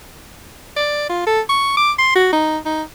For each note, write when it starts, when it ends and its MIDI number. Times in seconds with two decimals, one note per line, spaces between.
0.76 1.08 74
1.09 1.25 65
1.27 1.41 69
1.49 1.76 85
1.77 1.92 86
1.99 2.12 84
2.16 2.32 66
2.33 2.58 63
2.66 2.83 63